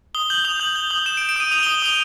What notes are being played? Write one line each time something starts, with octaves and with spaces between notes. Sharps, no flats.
D#6 G7
G6 F#7
D#6 F7
G6 F#7
G6 G7
D#6 F#7
G6 E7
D7
G6
D7
D#6 D#7
D#6 F7
G7
D#6
G7
D#6 F7